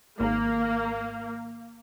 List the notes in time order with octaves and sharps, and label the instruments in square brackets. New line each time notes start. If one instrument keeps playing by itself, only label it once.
[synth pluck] G#1 [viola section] A#3